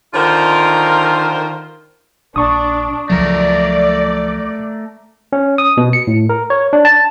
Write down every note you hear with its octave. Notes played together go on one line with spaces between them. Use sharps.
D3 D#3 F4 A#4 C5
A#1 D4 A5 C#6 D#6
C#2 F3 F#3 A3 A#4 D5
C#4
D#6
B2
C#7
A2
A#4
C#5
D4
A5